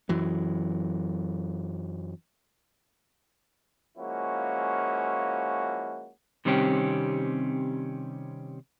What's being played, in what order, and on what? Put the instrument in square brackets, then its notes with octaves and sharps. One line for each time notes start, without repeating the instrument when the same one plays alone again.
[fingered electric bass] F#2 E3 F#3
[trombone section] F3 G#3 A#3 C#4 E4 F#4
[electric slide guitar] C3 D#3 G3 C4 C#4 G4